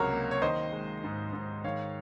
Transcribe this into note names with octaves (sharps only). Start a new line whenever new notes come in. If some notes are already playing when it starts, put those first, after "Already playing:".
Already playing: C#2 C3 F#3 F#4 A#4 C#5
A#3
C#5
D#3 C5 D#5
G#3
G#2
G#2
D#3 C#5 F5